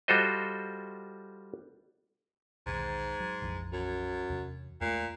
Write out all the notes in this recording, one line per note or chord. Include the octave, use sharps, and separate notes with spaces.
G3 F4 F#4 A4 C5 D#5
B1 E2 G#2 D#3
F#3
A#1 F2 E3
F#2
E2 C3
E2 A#2 G#3 A3